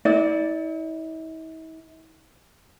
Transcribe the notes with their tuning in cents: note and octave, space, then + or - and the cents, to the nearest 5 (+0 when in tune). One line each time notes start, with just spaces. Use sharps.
E4 -45 D5 +0